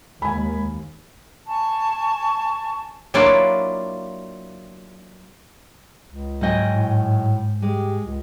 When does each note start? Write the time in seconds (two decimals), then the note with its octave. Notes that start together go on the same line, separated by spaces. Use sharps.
0.22 D#2 G#3 G#5 B5
1.47 G#5 A5 C#6
3.14 F#3 A#3 D4 E4 F4 D5
6.10 C#2
6.41 G#2 F#3 D#5 G5 G#5
6.70 A2
7.62 G#3 G4
8.05 C#2